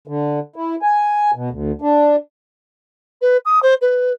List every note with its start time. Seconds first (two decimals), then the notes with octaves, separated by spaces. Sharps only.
0.07 D3
0.56 E4
0.82 G#5
1.35 B2
1.51 D2
1.82 D4
3.22 B4
3.45 D#6
3.63 C5
3.82 B4